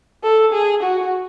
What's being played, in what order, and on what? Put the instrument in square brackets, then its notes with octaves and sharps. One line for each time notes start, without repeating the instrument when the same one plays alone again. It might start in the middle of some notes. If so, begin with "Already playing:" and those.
[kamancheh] A4
G#4
F#4